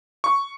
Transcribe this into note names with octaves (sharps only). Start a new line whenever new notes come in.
C#6